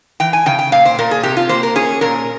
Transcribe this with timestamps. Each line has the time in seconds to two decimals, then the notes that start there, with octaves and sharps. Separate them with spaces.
0.20 E3 G5
0.33 G#5
0.46 C#3 G5
0.59 G5
0.72 A#2 F5
0.85 C5
0.99 A#2 A#4
1.11 G#4
1.23 C3 G4
1.37 F4
1.49 A#3 C5
1.63 A#4
1.76 C#4 G#4
2.01 A#2 A#4